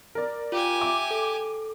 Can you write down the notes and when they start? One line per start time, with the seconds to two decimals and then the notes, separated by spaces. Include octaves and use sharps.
0.15 A#4 D5
0.52 F4 G4 G#5
0.81 E5 D6
1.11 A4